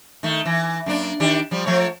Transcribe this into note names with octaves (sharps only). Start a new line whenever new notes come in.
D#3 A3
E3
F#2 A#3 D4
D#3 D4 G4
F3 G3
F3 A3 C#5